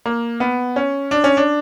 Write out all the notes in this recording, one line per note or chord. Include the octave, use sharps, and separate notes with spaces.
A#3
B3
C#4
D4
C#4
D4